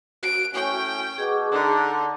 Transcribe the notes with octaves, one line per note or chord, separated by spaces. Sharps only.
F#4 D7
A2 C#4 G5
B2 G#4 D6
D3 D#4